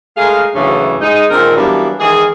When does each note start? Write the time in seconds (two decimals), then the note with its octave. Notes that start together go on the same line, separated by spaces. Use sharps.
0.17 G#3 A3 G#4 A#4 F5
0.55 D2 G#2 C#3 E3 F#3 D4
1.01 G#3 D#4
1.30 A#2 D3 D#3 G#3 C4 A#4
1.56 E3 F#3 G3 A#3 B3 D4
2.00 D#3 E3 G#3 G#4